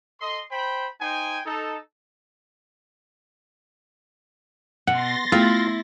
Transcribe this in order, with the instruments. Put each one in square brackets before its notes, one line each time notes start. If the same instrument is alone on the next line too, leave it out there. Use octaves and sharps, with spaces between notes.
[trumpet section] A4 D#5 C6
C5 G5 B5
D#4 C5 G5 G#5
D#4 A4
[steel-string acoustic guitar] B2 [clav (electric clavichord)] F#5 [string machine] C6 A6 A#6
[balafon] A3 B3 G#4 [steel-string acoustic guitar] E4 E5 [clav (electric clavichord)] F4